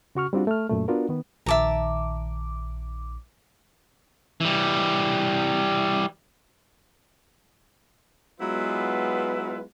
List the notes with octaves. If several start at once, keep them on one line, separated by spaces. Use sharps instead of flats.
C#3 F#4 C#6 F6
G3 C4 D4 F4 F#4
A3 F6
F#2 A#2 A3
B3 D4 F4 F#4 A#4
D#3 B3
A#1 D#3 E5 A5 A#5 D6
E3 G3
F#3 G#3 B3 E4 F4 B4